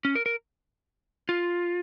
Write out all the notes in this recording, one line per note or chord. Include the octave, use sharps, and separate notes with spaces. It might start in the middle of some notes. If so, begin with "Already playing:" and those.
C#4
A#4
A#4
F4